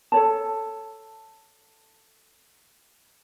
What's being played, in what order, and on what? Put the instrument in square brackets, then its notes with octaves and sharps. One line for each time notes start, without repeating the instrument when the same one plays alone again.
[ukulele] A4 C#5 A5